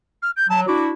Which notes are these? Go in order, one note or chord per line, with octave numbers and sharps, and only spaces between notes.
F6
G6
F#3 A5
D4 E4 F#4 D6